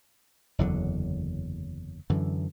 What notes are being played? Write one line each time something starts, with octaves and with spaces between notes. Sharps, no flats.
F#1 E2 D3 F#3
F#2 D3 E3